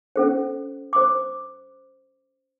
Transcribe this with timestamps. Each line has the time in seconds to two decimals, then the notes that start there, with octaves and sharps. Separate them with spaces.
0.16 C#4 A4 C5
0.93 C5 D6